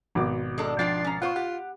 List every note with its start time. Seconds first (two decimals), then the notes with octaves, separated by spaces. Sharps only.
0.15 G#1 B2 D6
0.58 G#3 D4 A4
0.79 D#3 F3 D4 F4 G5 A6 C7
1.04 C#4 A#5
1.22 B3 F4 C5 F#5 C#6
1.36 G4 F#5